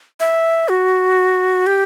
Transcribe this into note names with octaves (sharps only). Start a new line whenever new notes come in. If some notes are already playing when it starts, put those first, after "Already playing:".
E5
F#4
G4